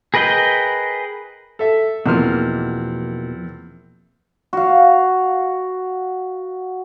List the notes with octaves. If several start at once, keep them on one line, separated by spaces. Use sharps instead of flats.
G#4 A#4 B4 D#5 G5
A4 E5
E2 B2 F3 A#3 C4 F6
F#4 F5